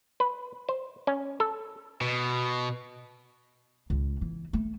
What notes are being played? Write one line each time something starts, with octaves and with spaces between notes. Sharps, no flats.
B4
C5
C#4
A4
B2
C#2
E3
A3